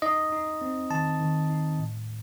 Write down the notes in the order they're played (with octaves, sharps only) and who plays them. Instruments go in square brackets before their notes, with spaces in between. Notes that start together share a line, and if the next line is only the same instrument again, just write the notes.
[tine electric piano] D#4 D#5
D#4
C4
D#3 A5
D#3
D#4
A2